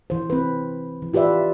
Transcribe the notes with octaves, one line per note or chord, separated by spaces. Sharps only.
E3 C5
C4 B4
E3
F4 G4 B4 D5 E5